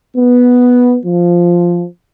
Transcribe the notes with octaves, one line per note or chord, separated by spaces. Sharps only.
B3
F3